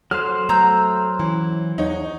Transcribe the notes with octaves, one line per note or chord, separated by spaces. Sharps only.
F#3 A4 C5 F6
A3 B3 A#5 E6 G6
E3 C#4
E2 B3 D#4 C#5